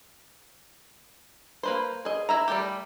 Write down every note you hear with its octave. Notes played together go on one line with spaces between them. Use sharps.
A#3 B4 C5
G#4 D#5
E4 E5 A#5
G3 A3 G4